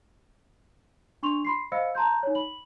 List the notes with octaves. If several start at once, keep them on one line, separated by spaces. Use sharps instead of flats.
D4 C6 C#6 F7
B5 C6 C7
C5 D#5 F5 B5 E6 C#7
A5 A#5 C6 G6
D#4 C#5
B5 F#7